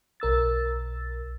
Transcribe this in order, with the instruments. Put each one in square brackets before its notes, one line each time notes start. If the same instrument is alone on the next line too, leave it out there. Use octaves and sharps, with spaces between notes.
[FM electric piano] B1 A#4 E6 A6